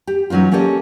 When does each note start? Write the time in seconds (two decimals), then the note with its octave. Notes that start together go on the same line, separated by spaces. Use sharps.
0.07 G4
0.30 E3 F#3 C#4 D#4 F4
0.52 A#3 C#4 G4 A4 D#5